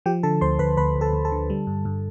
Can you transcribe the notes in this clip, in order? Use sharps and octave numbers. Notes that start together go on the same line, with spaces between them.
F3 G4 G5
D3 A4 A5
D2 C5 C6
D2 B4 B5
D2 B4 B5
D2
A4 A5
D2
A4 A5
D3
G3
G2
G2